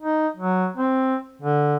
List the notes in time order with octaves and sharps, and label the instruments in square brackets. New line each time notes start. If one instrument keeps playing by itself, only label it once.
[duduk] D#4
F#3
C4
D3